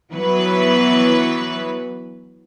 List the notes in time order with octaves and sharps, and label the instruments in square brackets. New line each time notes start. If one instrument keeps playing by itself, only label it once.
[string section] E3 F#3 B3 B4